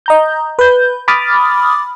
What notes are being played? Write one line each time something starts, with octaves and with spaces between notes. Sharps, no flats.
D#5 A#5 G6
B4 G6
B5 D6 D#6 F6 A6